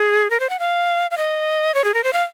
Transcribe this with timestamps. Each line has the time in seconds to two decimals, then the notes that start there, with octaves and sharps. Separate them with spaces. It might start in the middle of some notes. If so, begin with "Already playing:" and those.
Already playing: G#4
0.30 A#4
0.40 C5
0.50 F#5
0.59 F5
1.11 F5
1.18 D#5
1.74 C#5
1.84 G#4
1.94 A#4
2.04 C5
2.13 F5